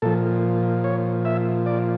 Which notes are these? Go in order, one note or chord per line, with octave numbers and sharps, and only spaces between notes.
A#2 F3 A4
C#5
E5
D5